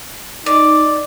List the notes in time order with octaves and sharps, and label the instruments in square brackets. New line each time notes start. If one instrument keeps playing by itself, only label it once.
[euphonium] D#4 [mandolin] D5